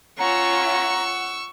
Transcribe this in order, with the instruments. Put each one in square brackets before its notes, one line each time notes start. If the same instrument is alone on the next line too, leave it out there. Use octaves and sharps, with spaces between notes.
[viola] C#4 F4 [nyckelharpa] F#5 [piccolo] A#5 [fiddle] C#6 E6